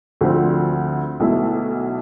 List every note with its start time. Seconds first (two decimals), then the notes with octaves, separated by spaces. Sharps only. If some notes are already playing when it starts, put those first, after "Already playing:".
0.21 D2 D3 F3 C4
1.20 B1 B2 A3 E4 A4